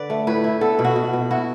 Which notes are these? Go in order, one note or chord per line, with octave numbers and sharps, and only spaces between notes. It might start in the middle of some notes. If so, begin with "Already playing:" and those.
Already playing: D3 B4 D5
A3
A2 B4
E4
B3 A4
B2
F#4
B2
B2
E4 F#4